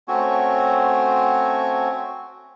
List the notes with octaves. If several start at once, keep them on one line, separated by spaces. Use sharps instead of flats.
A3 C4 C#4 F#4 C#5